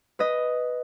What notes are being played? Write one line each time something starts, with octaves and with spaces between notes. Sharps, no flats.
B4 D#5